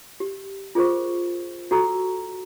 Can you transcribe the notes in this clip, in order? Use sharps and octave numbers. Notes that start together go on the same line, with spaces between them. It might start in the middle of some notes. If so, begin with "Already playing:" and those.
G4
F4 G#4 A#4 C5 C#6
F#4 A4 A#5 C#6 E6